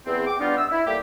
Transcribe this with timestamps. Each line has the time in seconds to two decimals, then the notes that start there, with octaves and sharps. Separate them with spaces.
0.06 E2 C4
0.27 G5 D6
0.40 G3 B3 D4 D#4 F4
0.56 E6
0.71 E4
0.87 G3 A3 A#3 G4